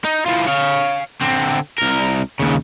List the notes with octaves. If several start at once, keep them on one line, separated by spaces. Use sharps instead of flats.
D#4
E3 F4
C#5 F5
D3 C4
C2 A#4
D#2 C#3